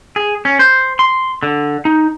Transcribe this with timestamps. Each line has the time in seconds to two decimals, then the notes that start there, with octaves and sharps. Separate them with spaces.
0.16 G#4
0.45 C#4
0.59 C5
0.99 C6
1.43 D3
1.85 D#4